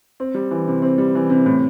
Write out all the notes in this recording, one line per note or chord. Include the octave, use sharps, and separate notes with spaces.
C4
G3
E3
C3
C4
G3
E3
C3
A2